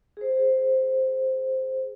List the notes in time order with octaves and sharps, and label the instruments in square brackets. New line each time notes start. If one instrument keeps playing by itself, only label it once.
[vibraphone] G#4 C5